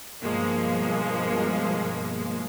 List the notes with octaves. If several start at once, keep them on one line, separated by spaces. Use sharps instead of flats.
G2 B2 F3 G#3 A#3